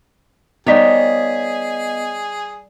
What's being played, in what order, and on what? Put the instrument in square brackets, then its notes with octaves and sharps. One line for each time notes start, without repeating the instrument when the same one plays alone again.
[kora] G3 D#4 C#5 [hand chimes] B3 D#5 B6 [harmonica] G#4